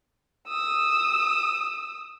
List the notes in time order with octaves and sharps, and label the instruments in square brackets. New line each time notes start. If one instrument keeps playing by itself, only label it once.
[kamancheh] D#6 E6